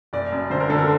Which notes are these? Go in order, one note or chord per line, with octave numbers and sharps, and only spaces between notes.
F#1 D5
F#2
D3 C5
A#4
D3 A4
A#4